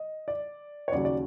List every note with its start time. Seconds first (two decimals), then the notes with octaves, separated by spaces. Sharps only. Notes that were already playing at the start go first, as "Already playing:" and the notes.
Already playing: D#5
0.28 D5
0.88 C#5
0.92 D#2 C#3 F#3 D5
1.05 D5